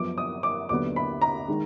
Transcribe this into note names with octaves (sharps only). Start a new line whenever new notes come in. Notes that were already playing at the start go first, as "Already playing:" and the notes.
Already playing: F#2 F3 B3 D6
D#6
D6
D#2 D3 F#3 B3 D6
B5
A#5
D#3 G#3